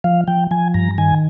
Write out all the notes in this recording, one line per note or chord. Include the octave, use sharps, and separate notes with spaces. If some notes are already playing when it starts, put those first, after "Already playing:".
F3 F5
F3 G5
F3 G#5
G2 A#5
D#3 G#5